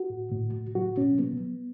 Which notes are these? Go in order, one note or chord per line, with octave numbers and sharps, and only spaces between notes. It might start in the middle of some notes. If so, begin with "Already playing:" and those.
Already playing: F#4
A2
A2
A2
F#3 F#4
B2 C#4
F#3 B3
F#3